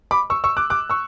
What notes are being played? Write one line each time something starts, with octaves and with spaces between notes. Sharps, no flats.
B5 D6
C#6 E6
C#6 E6
D6 F#6
D6 F#6
C#6 E6